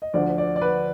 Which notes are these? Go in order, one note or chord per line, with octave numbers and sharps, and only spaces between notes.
D#5
D2 D3 F3 D5
D5
D5
B4